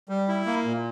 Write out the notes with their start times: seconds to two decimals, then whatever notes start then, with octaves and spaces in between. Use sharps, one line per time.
0.09 G3
0.28 E4
0.46 A#3
0.64 A#2